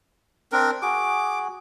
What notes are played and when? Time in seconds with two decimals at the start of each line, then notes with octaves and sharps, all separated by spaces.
0.52 C4 D4 A#4
0.82 F#4 G#4 D6